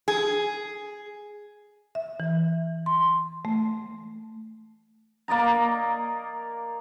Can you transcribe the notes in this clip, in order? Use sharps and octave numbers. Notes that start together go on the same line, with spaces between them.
G#4
E5
E3
C6
A3
A#3 D5 D#5 A#5